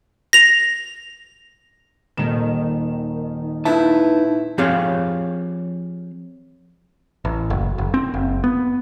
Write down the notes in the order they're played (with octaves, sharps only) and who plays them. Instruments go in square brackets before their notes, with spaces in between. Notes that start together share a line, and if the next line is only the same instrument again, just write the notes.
[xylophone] A#6 F7
[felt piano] D#1 E7 [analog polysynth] D#3
[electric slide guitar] D#4 B4 A5 [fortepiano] E4
[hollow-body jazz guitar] F3 C4 G4 G#4 C#5 F5
[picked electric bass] A1
F#1
F#1
C4
F#1
B3